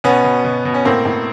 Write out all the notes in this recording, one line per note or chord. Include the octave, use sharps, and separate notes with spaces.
B2 B3 C#4
B2
B2
B2
C#4
A2 A#3 C4
A2